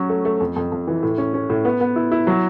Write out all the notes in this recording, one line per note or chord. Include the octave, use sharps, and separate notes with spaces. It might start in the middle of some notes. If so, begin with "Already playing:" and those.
Already playing: F#3 C#4
A3
A3
F2
F2
F2
E3
A2
C#4
C#4
A2
B3
B3
E4
E4
F#3